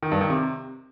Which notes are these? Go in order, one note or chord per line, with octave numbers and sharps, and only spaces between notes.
D#3
G2
D#3
C3